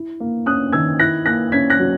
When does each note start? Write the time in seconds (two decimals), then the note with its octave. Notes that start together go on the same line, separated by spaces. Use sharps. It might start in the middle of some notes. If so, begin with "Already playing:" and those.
Already playing: E4
0.20 A#3
0.46 C#4 D#6 F#6
0.72 D#3 E6 G#6
0.99 E4 F#6 A#6
1.26 A#3 F#6 A#6
1.52 C#4 G#6 B6
1.70 F#6 A#6
1.79 F#3